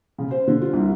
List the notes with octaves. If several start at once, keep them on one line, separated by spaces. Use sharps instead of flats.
C#3
C5
D3
F4
C2